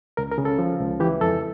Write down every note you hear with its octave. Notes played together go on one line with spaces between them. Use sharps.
C#2 A#4
A#4
C#3
A4
F3
C#2
E3 G4
F2 A4